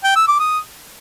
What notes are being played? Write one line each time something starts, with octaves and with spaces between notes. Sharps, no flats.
G5
E6
D6
D#6